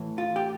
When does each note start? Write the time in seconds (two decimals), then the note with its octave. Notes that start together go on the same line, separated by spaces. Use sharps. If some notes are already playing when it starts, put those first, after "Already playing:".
Already playing: A2 E3
0.18 F4
0.36 G4